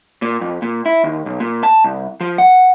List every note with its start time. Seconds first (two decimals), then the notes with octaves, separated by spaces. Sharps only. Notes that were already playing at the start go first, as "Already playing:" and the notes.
0.22 A#2
0.41 F2
0.62 A#2
0.86 E4
1.04 D#2
1.26 B1
1.40 A#2
1.63 A5
1.84 C2
2.21 F3
2.38 F#5